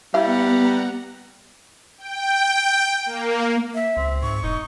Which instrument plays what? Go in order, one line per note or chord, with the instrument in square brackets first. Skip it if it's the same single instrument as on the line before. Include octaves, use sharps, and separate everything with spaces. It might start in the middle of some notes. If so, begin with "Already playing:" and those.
[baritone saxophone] G3 [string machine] B3 F#5 A#5 [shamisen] E4 F5
[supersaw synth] G5
A#3
[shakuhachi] E5
[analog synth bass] C#2 [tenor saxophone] C4
[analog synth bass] G#2 [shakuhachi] C#6
[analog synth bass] E1 [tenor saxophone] D#4